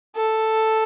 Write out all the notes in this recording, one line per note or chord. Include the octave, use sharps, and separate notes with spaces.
A4